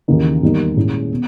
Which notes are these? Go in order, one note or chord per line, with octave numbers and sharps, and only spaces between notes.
D#2 C#3 E3 A#3 D#4
E2 D#3 G3 A#3 D#4
A#2 G#3 C#4 E4
B2